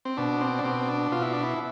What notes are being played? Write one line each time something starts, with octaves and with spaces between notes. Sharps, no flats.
C4
B2 D4
C4
D4
B2 C4
D4
B2 F4
E4
D4
E4